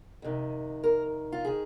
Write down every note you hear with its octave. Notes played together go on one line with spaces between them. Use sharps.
F2 C3 D#3
A#4
F4
D#3 G#4